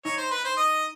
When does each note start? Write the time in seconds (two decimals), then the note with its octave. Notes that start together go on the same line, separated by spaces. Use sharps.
0.05 D#4 C#5
0.18 C5
0.31 B4
0.45 C5
0.57 D#5